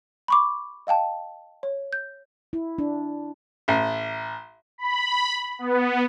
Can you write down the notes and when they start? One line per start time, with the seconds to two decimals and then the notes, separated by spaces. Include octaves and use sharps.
0.28 B5 C#6 D6
0.87 D#5 F5 G5 A5
1.63 C#5
1.93 G6
2.53 E4
2.78 D4
3.68 A1
4.78 B5
5.59 B3